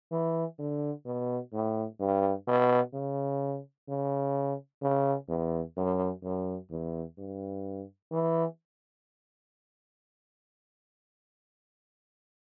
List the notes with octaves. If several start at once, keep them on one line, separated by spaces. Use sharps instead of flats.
E3
D3
B2
A2
G2
B2
C#3
C#3
C#3
E2
F#2
F#2
E2
G2
E3